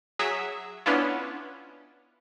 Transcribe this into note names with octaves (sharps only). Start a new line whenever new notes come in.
F#3 G#4 E5
B3 C#4 D4 E4 F4